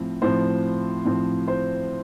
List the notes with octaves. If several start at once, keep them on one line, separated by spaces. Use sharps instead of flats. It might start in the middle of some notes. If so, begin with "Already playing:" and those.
Already playing: A2 F3 C4
A2 F3 C4 C5
A2 F3 C4
C5